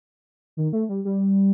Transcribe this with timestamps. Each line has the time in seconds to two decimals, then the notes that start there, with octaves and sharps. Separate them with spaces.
0.57 D#3
0.73 A3
0.89 G3
1.05 G3